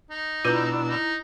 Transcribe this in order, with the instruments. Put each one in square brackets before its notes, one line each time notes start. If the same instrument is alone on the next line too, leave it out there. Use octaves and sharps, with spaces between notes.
[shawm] D#4
[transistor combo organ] B2 D4 E6 [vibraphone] E4 A#5 [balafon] F4 B4
[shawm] D#4